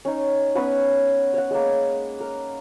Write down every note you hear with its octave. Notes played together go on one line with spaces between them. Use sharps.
C#4 D#4
B3 C#4 B4 F#5
C#5 F#5
G#3 A#3
A#4